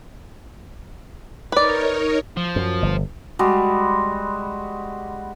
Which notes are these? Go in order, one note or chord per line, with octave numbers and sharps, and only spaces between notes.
D#4 A#4 B4 C#5 D5
F3
F#2
G1
G3 G#3 F#4